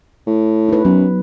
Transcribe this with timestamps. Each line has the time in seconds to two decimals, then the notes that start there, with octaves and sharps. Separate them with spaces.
0.27 A2
0.69 D#4 B4
0.85 F#2 F#3 B3